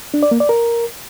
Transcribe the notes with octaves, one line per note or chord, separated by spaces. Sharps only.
D4
D5
A#3
D5
A#4